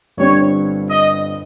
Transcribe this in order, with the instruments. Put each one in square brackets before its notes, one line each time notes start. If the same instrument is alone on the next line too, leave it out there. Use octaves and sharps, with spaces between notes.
[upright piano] G1 G2 G3 C4 [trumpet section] C#5
[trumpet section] D#5